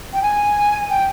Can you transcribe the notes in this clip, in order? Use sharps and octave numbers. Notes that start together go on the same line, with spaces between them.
G5
G#5
G5